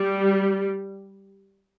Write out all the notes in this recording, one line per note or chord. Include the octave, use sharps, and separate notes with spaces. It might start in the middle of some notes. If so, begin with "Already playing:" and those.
Already playing: G3